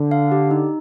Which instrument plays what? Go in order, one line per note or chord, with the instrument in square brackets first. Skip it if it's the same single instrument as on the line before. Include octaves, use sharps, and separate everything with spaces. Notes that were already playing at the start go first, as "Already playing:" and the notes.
Already playing: [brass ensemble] D3
[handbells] F5
G4
D#4